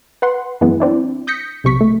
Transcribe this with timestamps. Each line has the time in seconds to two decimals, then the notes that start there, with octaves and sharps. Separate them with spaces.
0.22 B4 F#5 C6
0.61 F#2 E3 G#3 B3
0.80 C4 D4 E4
1.27 D#6 G6 A#6 B6 C#7
1.64 B1 C3 C#6 B6
1.81 A3